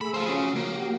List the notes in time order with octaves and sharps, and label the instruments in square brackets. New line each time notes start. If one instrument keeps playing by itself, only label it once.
[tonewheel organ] A3 G#4 E6 [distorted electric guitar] B5
[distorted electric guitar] C5 F5
[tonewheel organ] F3 F#4 [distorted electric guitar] C#4 G#4
[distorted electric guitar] A#3
[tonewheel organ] F#4 G4